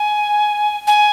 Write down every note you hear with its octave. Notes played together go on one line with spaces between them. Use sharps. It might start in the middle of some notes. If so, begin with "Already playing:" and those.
Already playing: G#5
G#5